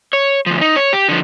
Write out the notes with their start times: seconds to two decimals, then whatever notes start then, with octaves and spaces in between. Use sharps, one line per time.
0.13 C#5
0.46 D2 F3
0.61 D#4
0.76 C#5
0.93 G4
1.08 D3 F3